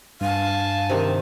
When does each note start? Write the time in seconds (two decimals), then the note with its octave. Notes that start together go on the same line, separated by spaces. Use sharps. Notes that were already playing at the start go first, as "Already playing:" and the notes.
0.21 G2 F5 G#5 A5
0.90 C3 D#3